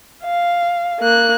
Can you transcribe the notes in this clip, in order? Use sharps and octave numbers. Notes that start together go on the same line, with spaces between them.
F5
A#3 F#6